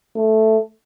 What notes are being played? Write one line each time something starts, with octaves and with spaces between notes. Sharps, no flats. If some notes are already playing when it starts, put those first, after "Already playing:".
A3